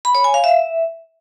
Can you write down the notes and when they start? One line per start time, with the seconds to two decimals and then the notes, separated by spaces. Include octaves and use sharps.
0.05 B5
0.15 C#5
0.24 G#5
0.34 F5
0.44 E5